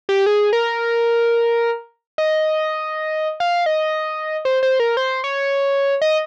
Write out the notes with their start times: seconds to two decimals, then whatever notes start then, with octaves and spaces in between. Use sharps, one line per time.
0.09 G4
0.26 G#4
0.53 A#4
2.18 D#5
3.40 F5
3.66 D#5
4.45 C5
4.63 C5
4.80 A#4
4.97 C5
5.24 C#5
6.02 D#5